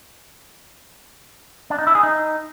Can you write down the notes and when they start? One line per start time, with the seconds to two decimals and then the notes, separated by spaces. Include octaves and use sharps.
1.70 D4
1.79 D#4
1.87 E4
1.95 G#4
2.03 D#4